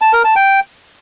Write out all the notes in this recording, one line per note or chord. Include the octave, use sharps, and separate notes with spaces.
A5
A#4
A5
G5